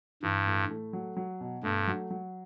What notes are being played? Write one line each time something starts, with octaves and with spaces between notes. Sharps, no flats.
G2 E3
A2
A3
F#3
F#3
B2
G2 A3
F#3
F#3